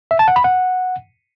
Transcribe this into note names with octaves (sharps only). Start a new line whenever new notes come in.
E5
A5
F#5
B5
F#5